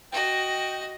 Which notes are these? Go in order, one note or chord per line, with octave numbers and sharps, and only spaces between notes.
F#4 D#5 G5